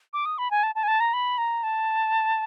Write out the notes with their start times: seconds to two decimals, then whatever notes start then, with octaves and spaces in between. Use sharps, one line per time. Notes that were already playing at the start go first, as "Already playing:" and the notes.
0.13 D6
0.26 D#6
0.38 B5
0.51 G#5
0.63 A5
0.75 A5
0.83 G#5
0.88 A5
1.00 A#5
1.13 B5
1.38 A#5
1.63 A5